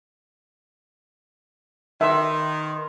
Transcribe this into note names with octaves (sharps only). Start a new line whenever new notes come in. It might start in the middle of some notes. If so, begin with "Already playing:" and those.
D#3 B4 E5 C6